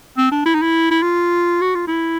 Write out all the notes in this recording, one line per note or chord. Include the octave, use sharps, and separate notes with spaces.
C4
D4
E4
D#4
E4
E4
F4
F#4
F4
E4